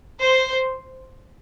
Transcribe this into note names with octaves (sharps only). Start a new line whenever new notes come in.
C5